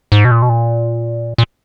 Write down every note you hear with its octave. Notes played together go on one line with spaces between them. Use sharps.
G#2
B2
A#2
B2
A#2
A#2